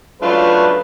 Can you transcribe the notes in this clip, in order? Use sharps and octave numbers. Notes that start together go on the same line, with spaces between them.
C#2 F#3 A3 D4 F4 B4